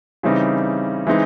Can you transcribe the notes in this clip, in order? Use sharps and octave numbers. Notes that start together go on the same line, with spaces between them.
C#3 E3 G3 C4 D#4
E3 G#3 C4 D#4